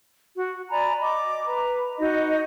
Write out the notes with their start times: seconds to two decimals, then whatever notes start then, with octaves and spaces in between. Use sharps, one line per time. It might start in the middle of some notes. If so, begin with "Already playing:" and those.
0.35 F#4
0.71 D5 G#5 A#5 B5
1.00 D#5 D6
1.45 B4 A#5
1.99 D#4 F#4 D#5